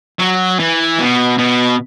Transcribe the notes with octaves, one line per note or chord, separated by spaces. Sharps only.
F#3
E3
B2
B2